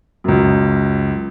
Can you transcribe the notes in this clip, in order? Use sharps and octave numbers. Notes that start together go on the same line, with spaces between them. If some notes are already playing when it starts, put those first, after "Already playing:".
C#2 F#2